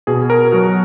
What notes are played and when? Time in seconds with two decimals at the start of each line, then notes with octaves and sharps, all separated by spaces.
0.07 B2 G#4
0.30 A#4
0.52 F#3 F#4